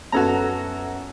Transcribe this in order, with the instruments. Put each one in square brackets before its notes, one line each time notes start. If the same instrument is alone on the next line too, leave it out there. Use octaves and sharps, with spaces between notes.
[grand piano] F#2 B3 G#6 [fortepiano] F#4 A4 A#5